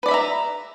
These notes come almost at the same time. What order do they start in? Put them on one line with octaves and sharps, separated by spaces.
B4 D5 B5 E5 A#5